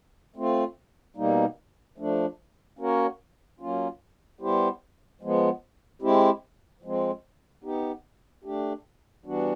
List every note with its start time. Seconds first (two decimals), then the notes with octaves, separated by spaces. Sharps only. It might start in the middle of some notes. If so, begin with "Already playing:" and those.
0.36 A3 C4 F4
1.17 B2 G3 A#3 D#4
1.98 F3 A3 D4
2.79 A#3 C#4 F#4 A#4 C#5
3.60 F#3 A#3 C#4 F4
4.40 G3 B3 E4 G4 C5
5.21 F3 G#3 B3
6.02 G#3 C4 E4 G4
6.82 F3 G#3 C4
7.63 B3 D#4 G4
8.44 A3 D4 G4
9.26 E3 G3 B3 D4 F#4